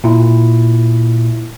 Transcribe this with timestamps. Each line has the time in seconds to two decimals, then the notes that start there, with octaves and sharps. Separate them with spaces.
0.04 A#2 E4